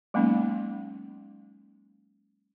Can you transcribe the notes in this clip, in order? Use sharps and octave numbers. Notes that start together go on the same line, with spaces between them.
F#3 G#3 A#3 B3 C#4 D#4